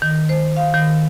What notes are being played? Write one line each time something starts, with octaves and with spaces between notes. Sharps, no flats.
D#3
C5
F5
D#3